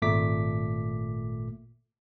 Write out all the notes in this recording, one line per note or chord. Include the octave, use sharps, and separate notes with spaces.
G#1 A#2 A3 D6 B6